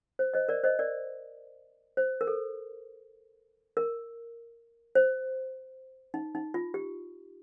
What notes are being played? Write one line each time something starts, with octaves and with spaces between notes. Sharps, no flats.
C5
C5 D#5
A#4 D5
C5 D#5
A#4 D5
C5
A#4
A4
A#4
C5
D#4
D#4
F4
G4